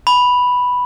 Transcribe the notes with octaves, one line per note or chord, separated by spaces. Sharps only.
B5